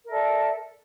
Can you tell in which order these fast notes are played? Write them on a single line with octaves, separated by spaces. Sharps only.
A#4 E5 A4 D5